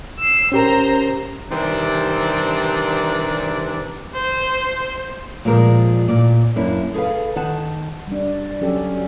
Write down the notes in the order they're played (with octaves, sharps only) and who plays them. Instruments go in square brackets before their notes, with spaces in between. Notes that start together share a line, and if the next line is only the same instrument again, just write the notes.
[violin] E6 C7
[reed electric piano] C#4 G4 A#4 [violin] C5 A#5
[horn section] C3 D#3 E3 G3 C4 D4
[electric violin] C5
[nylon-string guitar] A#2 F3 G#3 A#4 C5 D5
A#2 D5
F#2 A#3 D4 E4
G#4 A4 B4 F5
D#3 F#5 A5
[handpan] G3 D4
F#3 C#4 G4 A4